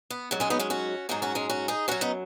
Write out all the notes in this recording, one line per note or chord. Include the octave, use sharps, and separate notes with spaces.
B3
G#2 F#3
G#3 C#4
B3 D#4
G#3 C#4
C#4 F#4
G#2 F#3 D#4 G#4
C#4 F#4
G#3 C#4
C#4 F#4
D#4 G#4
F#2 F#3 C#4 F#4
B3 D#4